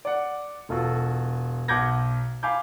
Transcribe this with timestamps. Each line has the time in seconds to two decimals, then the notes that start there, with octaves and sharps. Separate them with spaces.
0.05 D5 F#5
0.69 E1 F4 F#4 A4
1.68 B1 F#5 D6 G6 G#6 A#6
2.43 F5 G#5 B5 D6 G6